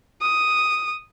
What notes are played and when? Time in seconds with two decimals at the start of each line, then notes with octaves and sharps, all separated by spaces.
0.21 D#6